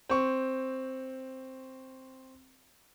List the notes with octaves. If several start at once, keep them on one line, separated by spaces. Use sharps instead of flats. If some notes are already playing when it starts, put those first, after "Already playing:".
C4 C#6